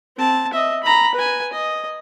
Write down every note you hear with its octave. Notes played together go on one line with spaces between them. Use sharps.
C4 A5
D#5 E5
A#5 B5
B4 G#5
D#5